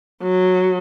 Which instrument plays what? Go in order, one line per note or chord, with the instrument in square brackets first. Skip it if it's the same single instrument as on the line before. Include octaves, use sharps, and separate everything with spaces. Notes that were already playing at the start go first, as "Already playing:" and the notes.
[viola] F#3